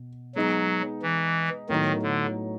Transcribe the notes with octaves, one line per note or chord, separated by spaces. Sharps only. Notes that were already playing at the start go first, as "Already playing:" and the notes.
Already playing: B2
F#3 G#3 B3 D#4 G#4
E3
A2 D#3 F#3 B3 D#4
D3